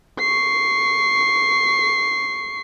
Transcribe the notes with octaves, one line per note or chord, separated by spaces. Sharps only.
C#6 C7